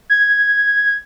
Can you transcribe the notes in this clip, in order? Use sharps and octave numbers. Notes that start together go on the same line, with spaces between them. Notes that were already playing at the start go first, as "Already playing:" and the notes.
G#6